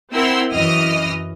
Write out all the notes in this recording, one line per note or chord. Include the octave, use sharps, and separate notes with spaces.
C4 E4 A#4 F#5 C6 E6
F#2 E3 D#5 D#6 F6